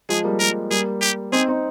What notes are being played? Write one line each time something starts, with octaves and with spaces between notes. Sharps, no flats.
F3 G#3 G#4
G3 A#3
G3 A#3 A#4
G3 A#3 G#4
G4
C4 D#4 G#4
C4 D#4